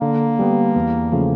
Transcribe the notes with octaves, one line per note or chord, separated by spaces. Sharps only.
D3 A#3
G3 B3
E2
C#3 F3 A3